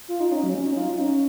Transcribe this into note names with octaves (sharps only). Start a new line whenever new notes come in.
F4
D#4
C#4
F#3
C#4
D#4
F4
D#4
C#4